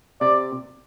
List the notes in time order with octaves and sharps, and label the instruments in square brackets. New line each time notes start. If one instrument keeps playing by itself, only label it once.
[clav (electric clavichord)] C3 [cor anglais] D5